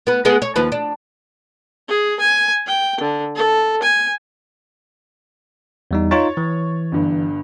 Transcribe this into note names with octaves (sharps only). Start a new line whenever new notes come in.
B3 B4
G#3 B3 G#4
C#5
D#2 F3 B4
D4
G#4
G#5
G5
D3
A4
G#5
E2 G3 D#4
D#4 F4 C#5 C#6 A6
E3
G1 G2